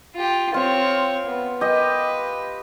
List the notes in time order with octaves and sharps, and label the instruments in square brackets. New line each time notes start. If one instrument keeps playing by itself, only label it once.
[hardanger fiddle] F4 G4
[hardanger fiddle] C4 C#5 [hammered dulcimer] F4
[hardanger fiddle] B3
[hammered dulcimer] G4 D#5 [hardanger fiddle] B4